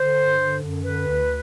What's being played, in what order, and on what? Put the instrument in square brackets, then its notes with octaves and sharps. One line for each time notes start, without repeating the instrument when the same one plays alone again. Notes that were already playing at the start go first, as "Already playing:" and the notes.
Already playing: [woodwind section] D3 C5
G2
D3
F#2
D3 B4
D2